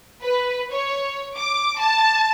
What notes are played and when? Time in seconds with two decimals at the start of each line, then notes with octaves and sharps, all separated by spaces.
0.21 B4
0.70 C#5
1.35 D6
1.78 A5